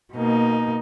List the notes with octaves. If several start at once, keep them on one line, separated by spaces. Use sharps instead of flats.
B2 A#3 D#4